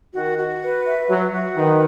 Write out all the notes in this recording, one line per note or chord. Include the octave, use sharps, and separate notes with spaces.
D#3 F#4
F#4
B4
E5
F#3 F#4
F#4
D#3 B4